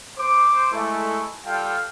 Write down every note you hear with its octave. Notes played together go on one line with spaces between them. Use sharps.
C5 D6
G#3 A3 E4 A4 C#6
G3 F4 A4 F5 G5